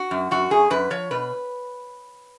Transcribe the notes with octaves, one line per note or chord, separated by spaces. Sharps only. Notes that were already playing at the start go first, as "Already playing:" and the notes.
Already playing: F#4
F#2
F#2 F#4
F#2 G#4
F#2 B4
F3 C#5
B2 B4